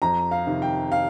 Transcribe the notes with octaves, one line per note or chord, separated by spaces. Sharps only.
F2 A#5
F5
C3 D#3
G5
F5